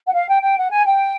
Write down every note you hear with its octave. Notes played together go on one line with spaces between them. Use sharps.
F#5
F5
G5
G5
F#5
G#5
G5